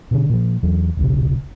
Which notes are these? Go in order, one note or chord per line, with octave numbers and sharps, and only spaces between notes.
B2 D3
A#2 F3
E2 F#3
D#1 B1 C#3